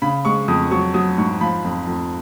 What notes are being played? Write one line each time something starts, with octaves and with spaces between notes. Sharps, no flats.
C#3 B5
G#3 C#6
F2 D#6
F#3 C#6
F#3 D#6
G#2 C#6
F3 B5
F2
F2